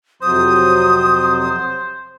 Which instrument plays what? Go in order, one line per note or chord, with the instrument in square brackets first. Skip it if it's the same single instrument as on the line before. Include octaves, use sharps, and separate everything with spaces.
[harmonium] F2 C3 F#3 [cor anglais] C5 [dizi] D#6